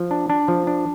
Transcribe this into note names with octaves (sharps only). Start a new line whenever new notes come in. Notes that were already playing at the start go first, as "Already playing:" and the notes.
Already playing: F3
D4
D4
F3
D4